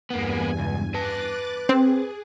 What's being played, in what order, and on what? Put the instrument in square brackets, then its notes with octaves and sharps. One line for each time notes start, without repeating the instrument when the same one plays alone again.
[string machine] E2 G2 G#5 [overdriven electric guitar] A#3 B3
[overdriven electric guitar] C#2
[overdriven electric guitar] B4 A5 [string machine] D6 F#6 A6
[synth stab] C4 [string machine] G#4